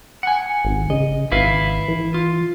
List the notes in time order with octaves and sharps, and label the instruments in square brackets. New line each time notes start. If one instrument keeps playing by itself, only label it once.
[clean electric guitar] F#5 G#5
[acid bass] G#1
[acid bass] C#3 [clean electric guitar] D#5
[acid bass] G#1 [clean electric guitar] E4 B4 F5
[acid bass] E3
[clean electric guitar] F4